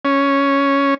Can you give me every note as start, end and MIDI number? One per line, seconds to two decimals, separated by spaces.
0.05 0.94 61